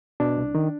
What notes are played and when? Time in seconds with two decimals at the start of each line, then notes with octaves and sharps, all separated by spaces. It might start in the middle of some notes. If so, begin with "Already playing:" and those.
0.20 B2 D4
0.37 C2
0.55 D#3